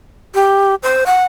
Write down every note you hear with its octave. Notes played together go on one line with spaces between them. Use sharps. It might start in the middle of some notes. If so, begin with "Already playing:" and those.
G4
C5
F#5